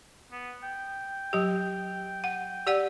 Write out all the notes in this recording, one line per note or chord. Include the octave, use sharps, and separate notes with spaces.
B3
G5
F#3 G4
F#5
G4 D5 F#5